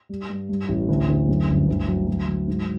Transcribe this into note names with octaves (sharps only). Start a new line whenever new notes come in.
G3
G2
G2
A1
D2
D2
F#2
G1
D2
F#3
F#3
F#3
G#2